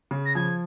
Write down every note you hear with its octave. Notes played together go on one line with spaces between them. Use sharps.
C#3
A#6
F3 G#6